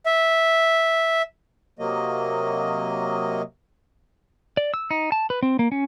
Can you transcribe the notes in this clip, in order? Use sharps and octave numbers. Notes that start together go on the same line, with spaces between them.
E5
C3 F#3 A#3 D#5
D5
E6
D#4
A5
B4
C4
A#3
C#4